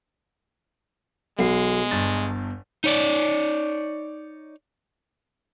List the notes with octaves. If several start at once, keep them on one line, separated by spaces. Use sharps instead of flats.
B1 G#3 B3 C7
G1 G2 A5
D#4 C#5 D5